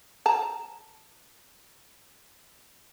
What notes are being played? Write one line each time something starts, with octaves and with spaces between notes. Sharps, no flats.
A5 A#5